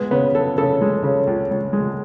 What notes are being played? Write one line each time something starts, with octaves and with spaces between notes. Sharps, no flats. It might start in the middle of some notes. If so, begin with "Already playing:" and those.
Already playing: G#3 B3
C#3 B3
C#3 A4
C#3 A4
G#3
C#3
C#2
C#2
G#3